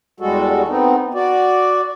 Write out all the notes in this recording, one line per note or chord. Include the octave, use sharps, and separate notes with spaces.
E2 G3 G#3 F#4 A4
B3 C4 D#4
F#4 D5